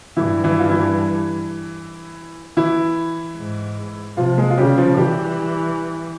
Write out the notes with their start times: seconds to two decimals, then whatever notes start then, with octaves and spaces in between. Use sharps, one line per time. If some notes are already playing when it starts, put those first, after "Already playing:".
0.17 G2 E3 E4
0.44 E3 E4
0.59 F4
0.70 E3 E4
2.57 E3 E4
3.37 G#2
4.17 C3 F3 F4
4.38 G#3 G#4
4.50 F4
4.58 C#3 G3 G4
4.78 F3 F4
4.97 E3 G3 G4